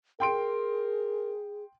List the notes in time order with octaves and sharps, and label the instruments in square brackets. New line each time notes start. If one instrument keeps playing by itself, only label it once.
[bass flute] G#4 [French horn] A#4 [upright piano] G5 C6 D7